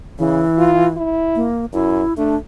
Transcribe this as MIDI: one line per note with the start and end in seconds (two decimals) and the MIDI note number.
0.19 0.43 49
0.19 0.94 52
0.58 0.87 65
0.97 1.47 64
1.36 1.66 58
1.73 2.02 42
1.73 2.14 64
2.17 2.36 57
2.17 2.37 62